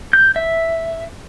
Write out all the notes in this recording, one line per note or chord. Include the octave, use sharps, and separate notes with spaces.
G6
E5